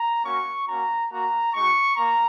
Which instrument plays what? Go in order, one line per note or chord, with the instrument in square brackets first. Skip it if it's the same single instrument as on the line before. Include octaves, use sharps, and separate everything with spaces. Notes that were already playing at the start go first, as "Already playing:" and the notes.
Already playing: [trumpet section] A#5
A#3 C#4 F#4 C#6
A#3 C#4 F#4 A#5
A#3 F#4 A#5
G#3 D#4 F#4 C#6
A#3 A#5